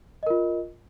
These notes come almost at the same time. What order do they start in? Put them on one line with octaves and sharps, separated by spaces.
D#5 A#4 F4